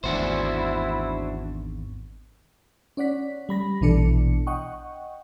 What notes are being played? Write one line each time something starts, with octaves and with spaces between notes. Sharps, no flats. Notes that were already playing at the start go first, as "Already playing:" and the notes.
G#1 E2 D4 E4 F#4 C5
C#4 D5 F#5 B6
G3 B5 A#6
A#1 B2 E3 D4 A4 C#7
D#5 F#5 G5 C#6